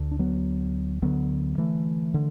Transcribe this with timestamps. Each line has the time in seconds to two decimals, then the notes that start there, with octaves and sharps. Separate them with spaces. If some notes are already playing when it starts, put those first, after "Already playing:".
Already playing: D2 D3
0.11 D4
0.19 F#3 B3
1.02 D2 D3 F#3 B3
1.58 E3 A3
2.14 D3